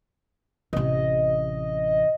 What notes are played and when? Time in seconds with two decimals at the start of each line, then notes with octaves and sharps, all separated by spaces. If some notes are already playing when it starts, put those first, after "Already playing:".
0.73 A1 C3 D#5